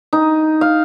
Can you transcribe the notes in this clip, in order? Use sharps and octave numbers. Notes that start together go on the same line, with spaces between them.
D#4
F5